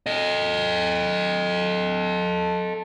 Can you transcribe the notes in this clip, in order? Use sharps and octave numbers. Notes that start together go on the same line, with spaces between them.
A4 D#5